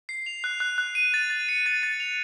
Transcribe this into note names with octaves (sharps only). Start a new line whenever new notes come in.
C7
F7
F#6
F#6
F#6
D#7
A6
A6
C#7
A6
A6
F7